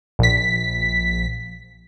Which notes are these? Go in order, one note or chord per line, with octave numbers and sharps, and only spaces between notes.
A#1 B6